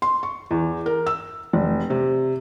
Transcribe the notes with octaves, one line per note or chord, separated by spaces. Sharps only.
C6
C#6
E2
A#4
E6
F1
C3